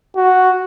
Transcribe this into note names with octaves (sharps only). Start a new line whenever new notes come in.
F#4